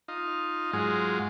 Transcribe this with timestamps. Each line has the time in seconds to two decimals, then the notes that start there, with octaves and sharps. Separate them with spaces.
0.08 D#4 F4
0.73 G#2 F#3 G#3 F4